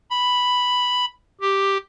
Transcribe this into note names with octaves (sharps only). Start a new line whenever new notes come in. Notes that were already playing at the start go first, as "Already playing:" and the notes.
B5
G4